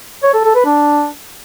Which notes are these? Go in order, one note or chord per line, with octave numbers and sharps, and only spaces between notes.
C#5
A4
A4
B4
D4